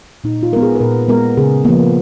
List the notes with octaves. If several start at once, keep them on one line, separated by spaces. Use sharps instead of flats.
A#2 D#4
F4
G#3 B3 A#4
G#4
B4
A#2 A#4
G#3 B3 A#4
C#3 G#4
F3 A#3 B3